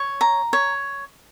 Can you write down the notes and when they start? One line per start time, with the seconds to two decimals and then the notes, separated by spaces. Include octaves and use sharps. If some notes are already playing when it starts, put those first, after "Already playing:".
Already playing: C#5
0.21 A#5
0.53 C#5